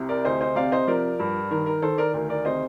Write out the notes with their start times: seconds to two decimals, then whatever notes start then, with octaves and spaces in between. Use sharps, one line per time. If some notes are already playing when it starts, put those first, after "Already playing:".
Already playing: C2 C3
0.09 A#4 D5
0.24 D2 C5 D#5
0.41 C5 D#5
0.55 C3 D5 F5
0.72 C5 D#5
0.87 F3 A#4 D5
1.20 G2
1.51 D#3 A#4
1.66 A#4
1.82 D#3 A4 C5
1.98 A#4 D5
2.13 D2 A#4
2.29 A#4 D5
2.45 C3 C5 D#5